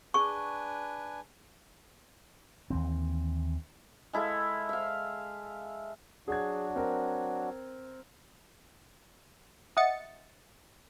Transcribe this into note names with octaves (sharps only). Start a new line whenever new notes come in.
D4 G#4 B4 G#5 C#6
D#2 E3 C4
G#3 E4 A4 F5
E5 F5
F#3 D4 F#4 G#4 G#6
C4 A#4
D#5 E5 F#5 D#6 A6 C#7